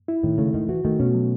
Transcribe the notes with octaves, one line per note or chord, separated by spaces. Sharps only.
E4
A2 D#3
C#3 A3
G#2 D#3
E3 F#4
D#3 A3
B2 C#4
F#3